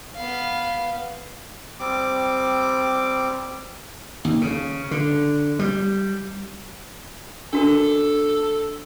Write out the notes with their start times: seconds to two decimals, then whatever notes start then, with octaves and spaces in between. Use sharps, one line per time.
0.16 B3 F5
1.80 G3 C4 D6
4.25 D#2
4.41 C#3
4.91 D3
5.59 G3
7.53 D4 F#4 A4 A#4